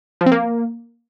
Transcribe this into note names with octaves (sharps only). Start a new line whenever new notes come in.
F3
C4
A#3